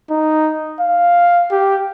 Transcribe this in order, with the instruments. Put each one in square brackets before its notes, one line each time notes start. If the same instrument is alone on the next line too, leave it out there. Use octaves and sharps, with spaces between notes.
[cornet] D#4
F5
G4